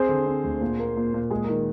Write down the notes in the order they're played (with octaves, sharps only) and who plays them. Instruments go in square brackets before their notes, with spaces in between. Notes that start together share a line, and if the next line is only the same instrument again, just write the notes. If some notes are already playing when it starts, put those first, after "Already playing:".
Already playing: [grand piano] C4 [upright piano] G#4 C5
[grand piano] D3
C4
D2
A#2
A#3
A#2
A#2
[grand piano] G#3 [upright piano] G#4
[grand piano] D#3 [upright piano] A#4